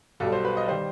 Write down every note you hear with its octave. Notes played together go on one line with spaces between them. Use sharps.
B1 B2 G3 A4
C5
B4
D#5
D#3 G3 C5